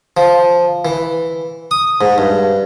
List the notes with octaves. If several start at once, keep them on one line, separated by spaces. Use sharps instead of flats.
F3
E3
D#6
G#2
G2